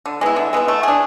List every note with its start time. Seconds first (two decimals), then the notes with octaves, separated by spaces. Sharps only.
0.06 D3
0.21 G#3 B3 E4
0.36 D3
0.53 G#3 B3 E4
0.68 A3
0.83 D4 G#4